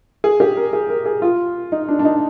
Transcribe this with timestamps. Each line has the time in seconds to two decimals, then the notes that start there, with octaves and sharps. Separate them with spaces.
0.24 G#4
0.40 G4
0.57 A#4
0.73 G#4
0.90 A#4
1.06 G#4
1.22 F4
1.72 D#4
1.89 D4
1.99 D4
2.05 D#4